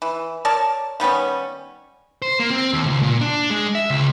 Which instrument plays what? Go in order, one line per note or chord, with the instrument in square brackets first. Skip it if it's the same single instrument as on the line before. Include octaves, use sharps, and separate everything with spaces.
[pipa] E3
A#4 C#5 D5 A5
D#3 G3 B3 C#4
[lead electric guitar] C5
A#3
C4
D#2
C#2
A#2
D4
G#3
E5
C#2